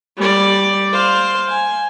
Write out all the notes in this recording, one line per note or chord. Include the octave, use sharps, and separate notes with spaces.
G3 D5
C5 F5
G#5